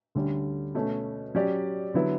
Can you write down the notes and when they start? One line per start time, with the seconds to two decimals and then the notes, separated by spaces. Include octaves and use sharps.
0.15 D2 D3 G3 C#4
0.75 B2 A3 C#4
1.35 F#3 C#4 G4 D5
1.94 D3 F#3 B3 E4